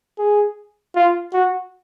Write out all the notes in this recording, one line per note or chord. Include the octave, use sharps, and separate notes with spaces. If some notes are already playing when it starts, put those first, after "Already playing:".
G#4
F4
F#4